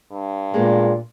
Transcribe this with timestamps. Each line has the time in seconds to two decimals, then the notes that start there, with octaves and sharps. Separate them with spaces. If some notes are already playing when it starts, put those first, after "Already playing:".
0.12 G2
0.54 A#2 G#3 A#3 B3